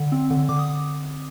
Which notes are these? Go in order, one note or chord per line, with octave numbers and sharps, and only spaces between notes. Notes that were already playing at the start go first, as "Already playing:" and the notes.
Already playing: D3
C4
D3
D3 D6
D#6